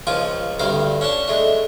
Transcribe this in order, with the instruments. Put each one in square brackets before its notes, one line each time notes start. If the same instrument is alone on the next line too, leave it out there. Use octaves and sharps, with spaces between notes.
[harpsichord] C#2 F3 F4 G#5 D6
D2 G2 C4 C5 F5 D6
C#4 D4 A5
G#3 A3 D4